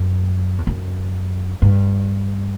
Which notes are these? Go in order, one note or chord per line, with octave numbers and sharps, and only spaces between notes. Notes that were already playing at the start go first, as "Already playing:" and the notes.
Already playing: F#2
E2
F#2
G2